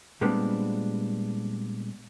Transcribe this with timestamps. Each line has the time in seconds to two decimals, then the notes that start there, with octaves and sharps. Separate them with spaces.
0.21 A#2 G3 G#3 B3 C4 D4